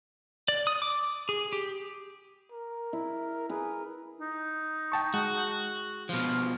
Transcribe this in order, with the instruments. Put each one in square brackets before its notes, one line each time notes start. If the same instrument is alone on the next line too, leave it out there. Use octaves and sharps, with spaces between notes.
[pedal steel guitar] D5
D#6
D6
G#4
G4
[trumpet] A#4
[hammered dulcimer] E4
[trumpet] G#4 [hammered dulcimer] A#4 B4
[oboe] D#4
[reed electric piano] G5 A5 C#6
[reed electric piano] G#3 [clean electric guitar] F#4
[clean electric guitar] B2 F3 [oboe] F4